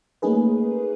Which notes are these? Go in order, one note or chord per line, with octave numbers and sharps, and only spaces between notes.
A3 A#3 C#4 D#4 G#4 B4